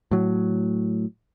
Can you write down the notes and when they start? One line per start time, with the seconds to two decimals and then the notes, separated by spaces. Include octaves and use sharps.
0.11 A2 F#3